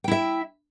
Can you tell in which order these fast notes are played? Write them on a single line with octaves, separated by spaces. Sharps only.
G5 E4 E5